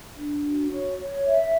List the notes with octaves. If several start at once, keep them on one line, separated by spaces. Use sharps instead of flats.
D4
F#4
C#5
C#5
E5